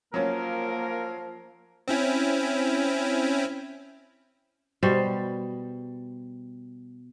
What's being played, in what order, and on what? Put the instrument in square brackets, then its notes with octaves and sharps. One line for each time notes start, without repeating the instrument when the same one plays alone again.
[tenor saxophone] F3 [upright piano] F#3 C#4 [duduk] A#3 [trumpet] A#4
[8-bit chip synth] C4 C#4 E4
[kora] B2 G3 C5